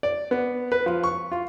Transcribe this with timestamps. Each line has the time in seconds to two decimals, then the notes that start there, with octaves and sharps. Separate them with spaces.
0.03 D5
0.31 B3
0.72 B4
0.86 F3
1.03 C#6
1.32 F4